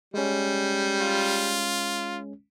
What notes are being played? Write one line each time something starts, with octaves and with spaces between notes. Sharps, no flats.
G3 G#3 C#4
F4